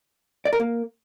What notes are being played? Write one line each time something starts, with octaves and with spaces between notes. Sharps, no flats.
D5
A#4
A#3